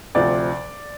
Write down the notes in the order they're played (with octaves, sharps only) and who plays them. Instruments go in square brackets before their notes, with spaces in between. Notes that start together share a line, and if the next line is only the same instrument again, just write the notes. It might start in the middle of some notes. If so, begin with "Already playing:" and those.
[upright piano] D2 C3 F3 D5